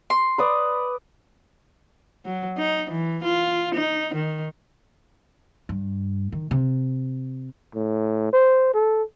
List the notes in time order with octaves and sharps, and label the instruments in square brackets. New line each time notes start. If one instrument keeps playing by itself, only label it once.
[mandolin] C6
[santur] B4 D5 D#6
[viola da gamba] F#3
D#4
E3
F4
D#4
D#3
[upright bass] G2
D#3
C3
[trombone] A2
C5
A4